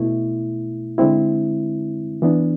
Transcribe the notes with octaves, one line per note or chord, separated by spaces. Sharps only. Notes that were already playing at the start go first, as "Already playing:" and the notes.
Already playing: B2 A3 E4
D3 G#3 C4 E4
E3 B3 D4